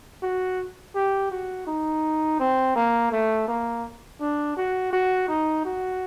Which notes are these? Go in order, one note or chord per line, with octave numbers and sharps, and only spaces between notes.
F#4
G4
F#4
D#4
C4
A#3
A3
A#3
D4
F#4
F#4
D#4
F#4